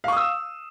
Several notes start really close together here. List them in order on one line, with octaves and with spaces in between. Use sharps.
F5 C#6 D#6 E6